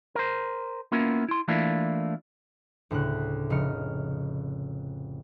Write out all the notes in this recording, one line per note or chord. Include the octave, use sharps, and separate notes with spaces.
A#4 C5
A#3 B3 C#4 E4 F4 A#4
E4 C6
E3 A3 A#3 D4 E4 F4
D2 A2 C#3 F#6
F1 C#3 D#5 F6 C#7